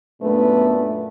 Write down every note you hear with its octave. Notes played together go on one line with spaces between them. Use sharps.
F#2 A#2 A3 B3 D4 B4